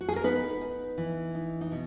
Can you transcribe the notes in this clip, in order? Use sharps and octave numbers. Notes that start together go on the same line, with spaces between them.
F#4
G#4
A#4
B3 D#4 B4
D#4
E3
D#4
D#4
B2